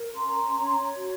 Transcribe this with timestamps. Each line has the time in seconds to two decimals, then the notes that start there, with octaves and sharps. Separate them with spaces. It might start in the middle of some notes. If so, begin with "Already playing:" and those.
Already playing: A#4
0.15 C#4 A#5 C6
0.56 C#5
0.97 F#4